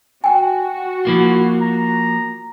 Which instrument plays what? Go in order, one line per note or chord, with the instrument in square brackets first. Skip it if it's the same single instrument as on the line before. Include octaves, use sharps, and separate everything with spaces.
[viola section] F#4 [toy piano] G5 G#5
[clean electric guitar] F3 A#3 F4 [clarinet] E4
[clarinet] A#5